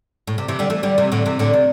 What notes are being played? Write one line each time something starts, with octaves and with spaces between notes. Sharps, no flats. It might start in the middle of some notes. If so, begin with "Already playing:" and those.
A2
C3
C3 E3
D3 G3
E3 A3
D3 G3
C3 E3
A2 D3
C3 E3
A2 D3
C3